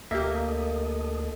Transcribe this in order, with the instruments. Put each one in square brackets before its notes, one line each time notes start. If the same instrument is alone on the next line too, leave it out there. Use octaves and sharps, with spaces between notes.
[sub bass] D2 [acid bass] A#3 [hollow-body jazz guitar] G4 E5 [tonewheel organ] A4 D#5